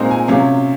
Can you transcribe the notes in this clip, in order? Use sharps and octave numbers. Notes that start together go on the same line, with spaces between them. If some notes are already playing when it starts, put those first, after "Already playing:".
Already playing: A#2 G#3 C4 D#4 A#5
G#5
C3 F#3 C#4 F5